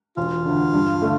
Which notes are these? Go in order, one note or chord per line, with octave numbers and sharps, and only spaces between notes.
E1 F4
D2 D3
G2
D3 A3